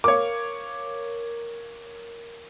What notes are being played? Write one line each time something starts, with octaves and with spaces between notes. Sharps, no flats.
A#4 C#5 F5 D6